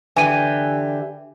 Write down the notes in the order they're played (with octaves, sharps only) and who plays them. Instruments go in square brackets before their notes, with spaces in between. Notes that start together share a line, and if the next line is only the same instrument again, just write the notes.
[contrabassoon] D3 [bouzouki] E3 G4 [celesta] G#5 D#7